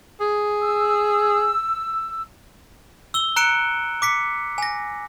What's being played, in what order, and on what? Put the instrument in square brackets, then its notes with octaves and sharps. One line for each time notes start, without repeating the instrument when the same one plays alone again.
[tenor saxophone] G#4
[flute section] E6
[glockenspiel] E6 G7
A#5 F#6 C#7 D7 E7
D6 B6 C#7
G#5 A#6